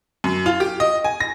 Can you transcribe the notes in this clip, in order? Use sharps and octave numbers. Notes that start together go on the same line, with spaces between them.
F#2
F4
G4
D#5
G#5
A#6